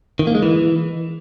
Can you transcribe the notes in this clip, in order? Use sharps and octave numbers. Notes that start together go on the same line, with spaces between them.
D#3
A#3
G#3
E3